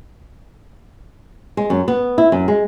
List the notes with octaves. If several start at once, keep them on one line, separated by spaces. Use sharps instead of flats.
G#3
F#2
B3
E4
F#2
G#3